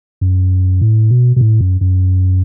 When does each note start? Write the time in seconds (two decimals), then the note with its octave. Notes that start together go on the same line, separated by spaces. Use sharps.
0.21 F#2
0.81 A2
1.10 B2
1.36 B2
1.41 A2
1.61 F#2
1.81 F#2